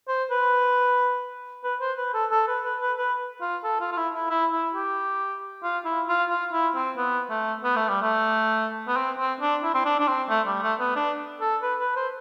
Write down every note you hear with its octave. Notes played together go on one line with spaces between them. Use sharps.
C5
B4
B4
C5
B4
A4
A4
B4
B4
B4
B4
F4
A4
F4
F4
E4
E4
E4
E4
G4
F4
E4
F4
F4
E4
C4
B3
A3
B3
A3
G3
A3
B3
C4
C4
D4
E4
C4
D4
D4
C4
A3
G3
A3
B3
D4
A4
B4
B4
C5